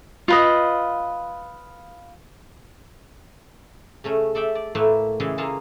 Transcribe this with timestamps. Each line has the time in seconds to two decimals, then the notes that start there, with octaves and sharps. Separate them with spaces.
0.28 F4 B4 D#5
4.04 C#3 A3 C#4
4.35 A4 D5 E5 G5
4.55 D5
4.75 A2 A3 A#3 B4 E5
5.20 C#3 E3 G#3 E4 G#4
5.38 A#3 F4 G#4 A4 D#5 A5